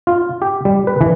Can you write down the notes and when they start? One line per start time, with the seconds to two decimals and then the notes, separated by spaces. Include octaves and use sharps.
0.07 F4
0.42 G4
0.65 G3
0.87 B4
1.01 E3